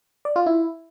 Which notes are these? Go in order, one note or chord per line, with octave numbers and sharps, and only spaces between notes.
D5
F4
E4